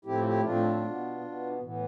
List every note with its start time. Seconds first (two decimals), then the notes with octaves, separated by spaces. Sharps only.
0.05 A2 F3 A3 C4 E4 G4
0.20 A4
0.24 E4 G4
0.43 A2 F3 A3 C4 D4 F4
0.83 B2 B3
1.21 B2 B3
1.60 A2 E3 B3